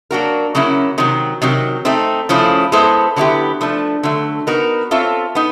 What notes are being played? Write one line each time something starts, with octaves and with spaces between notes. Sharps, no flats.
F#3 A#3 D4 F#4 A#4
C#3 F#3 A#3 C#4 E4
C3 D#3 F#3
C3 D#3 F#3
A3 C4 D#4
C#3 F3 A3 C#4 E4
G#3 B3 E4 A4 C5
D3 F#3 B3 E4 G4
F3 A3 D4
D3 F#3 A3
B3 D#4 F#4 A#4
C4 F4 A4 C#5 E5
B3 D#4